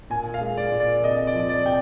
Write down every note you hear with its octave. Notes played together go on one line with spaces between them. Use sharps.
A#2 G#5
F5
G#3
D5
A#2
D5
C3 D#5
D5
F3
D5
C3 G5